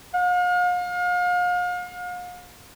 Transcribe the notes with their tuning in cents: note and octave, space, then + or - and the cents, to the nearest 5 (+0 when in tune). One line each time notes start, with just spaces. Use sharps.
F5 +40